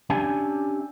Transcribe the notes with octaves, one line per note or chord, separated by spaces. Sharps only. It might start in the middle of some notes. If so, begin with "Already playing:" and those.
C#4 D4 G4 E5 G#5